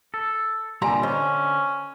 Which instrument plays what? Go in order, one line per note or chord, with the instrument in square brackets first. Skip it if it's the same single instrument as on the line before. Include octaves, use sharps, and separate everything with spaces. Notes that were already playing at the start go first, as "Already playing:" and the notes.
[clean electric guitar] A4
[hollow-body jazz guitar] C2 G3 A#5 [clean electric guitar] A#2 D3 [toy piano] G#5 C6
[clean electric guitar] D3 [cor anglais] C#4 [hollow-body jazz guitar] C5 [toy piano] D#5